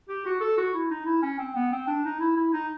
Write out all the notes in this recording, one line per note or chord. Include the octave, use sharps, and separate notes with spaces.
G4
F#4
A4
F#4
E4
D#4
E4
C#4
C4
B3
C4
D4
D#4
E4
E4
D#4